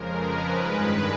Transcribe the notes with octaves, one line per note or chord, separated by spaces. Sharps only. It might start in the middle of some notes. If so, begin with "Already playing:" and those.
Already playing: F2 C#3 F3 G#3 A#4
B4
G2 D#3 G#3 B4